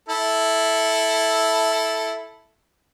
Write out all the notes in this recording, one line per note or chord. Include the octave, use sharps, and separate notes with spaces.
E4 A4